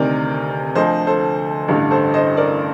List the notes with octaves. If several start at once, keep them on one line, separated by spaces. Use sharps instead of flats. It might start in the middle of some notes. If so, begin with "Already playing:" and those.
Already playing: D2 C3 D#3 A#4 D5
D2 D3 F3 C5 D#5
A4 C5
A1 G2 D3
A4 C5
C5 D#5
A#4 D5